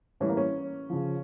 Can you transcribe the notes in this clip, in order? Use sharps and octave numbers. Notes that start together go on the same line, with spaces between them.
A2 E3 G3 C#4
A#3
C#4
C#3 F3